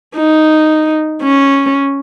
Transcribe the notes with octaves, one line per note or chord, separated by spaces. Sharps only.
D#4
C#4